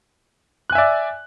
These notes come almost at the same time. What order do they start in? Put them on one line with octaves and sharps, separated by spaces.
F#6 G#5 E5 D5